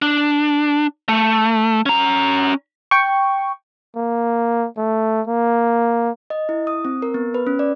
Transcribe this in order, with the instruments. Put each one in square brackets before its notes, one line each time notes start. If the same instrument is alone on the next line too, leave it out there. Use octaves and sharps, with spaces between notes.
[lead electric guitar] D4
A3
C#4 A#5
[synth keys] G5 C#6
[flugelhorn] A#3
A3
A#3
[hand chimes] D#5
E4
D#6
C4
A#4
B3
B4
C#4
D5